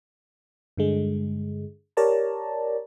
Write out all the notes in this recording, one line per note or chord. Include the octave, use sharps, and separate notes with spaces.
G2 D3 G#3
G4 A#4 C#5 D5 A5 A#5